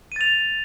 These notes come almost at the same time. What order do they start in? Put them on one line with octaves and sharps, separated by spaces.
D#7 A6 F7